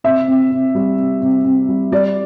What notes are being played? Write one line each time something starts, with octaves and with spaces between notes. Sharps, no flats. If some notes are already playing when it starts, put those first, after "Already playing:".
C3 E5
C3
C3
G3
C3
C3
C3
G3
G3 D5